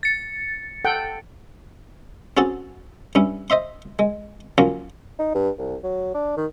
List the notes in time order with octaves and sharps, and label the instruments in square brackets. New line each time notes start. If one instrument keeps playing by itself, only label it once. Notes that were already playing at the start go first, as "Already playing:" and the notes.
[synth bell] A6 C#7
[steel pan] A4 F#5 G5
[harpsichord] C4 C#4 F#4 G#4 A4 A5
G2 C#4 E4
C5 D#5 E5 C6
G#3
F3 F#3 A#3 C#4 F4
[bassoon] D#4
G2
C2
F#3
D4
D#3